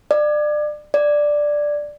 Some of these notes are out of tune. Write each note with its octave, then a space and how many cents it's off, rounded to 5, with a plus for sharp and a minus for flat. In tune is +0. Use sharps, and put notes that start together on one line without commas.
D5 +30
D5 +5